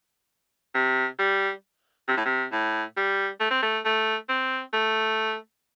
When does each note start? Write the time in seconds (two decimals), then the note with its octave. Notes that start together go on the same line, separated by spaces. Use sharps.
0.75 C3
1.19 G3
2.08 C3
2.17 A2
2.26 C3
2.52 A2
2.97 G3
3.40 A3
3.51 C4
3.62 A3
3.85 A3
4.29 C4
4.73 A3